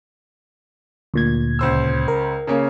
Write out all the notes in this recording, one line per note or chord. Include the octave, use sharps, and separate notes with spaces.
D2 A#2 G#6
C#2 C5 E6
A#4
C#3 A#3 C#4